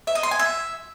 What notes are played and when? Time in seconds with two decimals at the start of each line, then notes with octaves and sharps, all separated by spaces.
0.07 E5
0.15 D#5
0.23 C6
0.31 G#5
0.39 E5